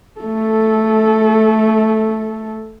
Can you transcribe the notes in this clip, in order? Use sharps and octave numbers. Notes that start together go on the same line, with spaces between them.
A3 A4